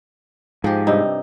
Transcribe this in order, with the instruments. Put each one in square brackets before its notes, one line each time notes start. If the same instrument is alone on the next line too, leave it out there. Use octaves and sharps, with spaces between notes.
[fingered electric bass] G#2 [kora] F3 G4
[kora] G2 C3 D#4